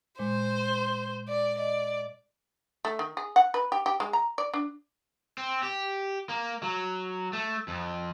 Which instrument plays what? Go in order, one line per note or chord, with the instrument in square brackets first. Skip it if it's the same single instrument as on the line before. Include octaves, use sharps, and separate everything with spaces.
[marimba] A#2 G#3 [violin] C5
[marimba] C6
[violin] D5
[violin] D5 [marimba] D#5
[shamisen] A3
D#3
G#4
F#5
B4
G4
G4
G#3
A#5
D5
D4
[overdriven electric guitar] C4
G4
A#3
F#3
A3
F2